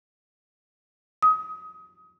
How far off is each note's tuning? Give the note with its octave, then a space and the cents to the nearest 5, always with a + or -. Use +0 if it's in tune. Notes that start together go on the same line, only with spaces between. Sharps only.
D#6 +25